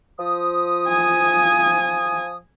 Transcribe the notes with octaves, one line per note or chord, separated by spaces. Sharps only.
F3 D#6
G#5